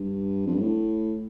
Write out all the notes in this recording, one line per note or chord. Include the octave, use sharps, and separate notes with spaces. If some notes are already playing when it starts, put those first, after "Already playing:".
Already playing: G2
F2
G2
A2